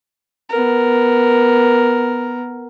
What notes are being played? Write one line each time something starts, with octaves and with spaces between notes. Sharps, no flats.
B3 A#4